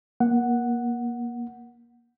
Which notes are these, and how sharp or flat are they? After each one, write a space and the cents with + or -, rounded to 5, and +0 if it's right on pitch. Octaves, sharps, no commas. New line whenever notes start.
A#3 +25 F#5 -5